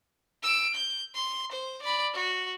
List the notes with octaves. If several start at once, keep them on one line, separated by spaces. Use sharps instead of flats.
E6 D7
G6
C6
C5
D5 B5
F#4